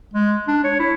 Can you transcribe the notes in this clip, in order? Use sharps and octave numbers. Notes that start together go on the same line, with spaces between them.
G#3
D4
C#5
E4